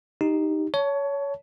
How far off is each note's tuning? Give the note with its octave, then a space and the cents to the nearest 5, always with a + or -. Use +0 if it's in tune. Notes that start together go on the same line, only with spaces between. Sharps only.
D#4 +0 G4 +0
C#5 +20 A5 +0